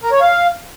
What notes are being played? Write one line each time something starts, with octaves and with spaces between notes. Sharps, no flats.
A#4
C#5
F5